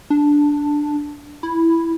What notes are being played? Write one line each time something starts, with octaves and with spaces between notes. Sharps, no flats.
D4
E4